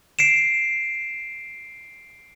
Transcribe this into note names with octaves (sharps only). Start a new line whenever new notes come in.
C7 D7 E7